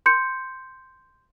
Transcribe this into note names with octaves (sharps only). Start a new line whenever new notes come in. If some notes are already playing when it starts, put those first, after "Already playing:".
C6 G6 C#7